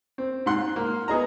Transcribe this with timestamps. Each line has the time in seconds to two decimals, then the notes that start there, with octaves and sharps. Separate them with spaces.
0.18 C4
0.46 G#2 F#5 C6 F#6
0.76 A#3
1.08 B3 G#4 D#5 A#5